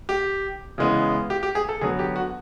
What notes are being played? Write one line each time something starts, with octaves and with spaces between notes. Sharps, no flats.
G4
C#3 E3 G#3 B3
G4
G4
G#4
A4
D3 F#3 B3 G#4
G4
F#4